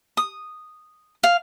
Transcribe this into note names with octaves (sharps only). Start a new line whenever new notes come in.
D#6
F5